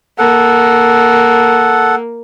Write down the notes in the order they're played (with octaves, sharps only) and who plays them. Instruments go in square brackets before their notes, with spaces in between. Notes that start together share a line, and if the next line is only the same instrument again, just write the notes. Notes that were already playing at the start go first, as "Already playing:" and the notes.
[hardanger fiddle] A#3 [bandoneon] A4 F#5